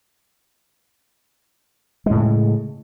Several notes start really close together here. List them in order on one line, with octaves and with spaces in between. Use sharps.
G#3 A2 C#3